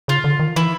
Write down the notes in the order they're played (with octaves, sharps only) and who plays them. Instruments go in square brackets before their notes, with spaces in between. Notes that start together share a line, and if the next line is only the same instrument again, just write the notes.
[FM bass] C#3 [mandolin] F4
[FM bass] D3
D#3
[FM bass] E3 [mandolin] E4